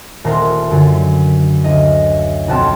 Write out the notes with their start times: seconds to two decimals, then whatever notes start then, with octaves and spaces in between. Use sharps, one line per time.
0.24 D#1 A3 A#4 C5
0.71 F#2 D3
1.64 D2 D#5
2.48 B1 F2 C4 F#5 A5 F6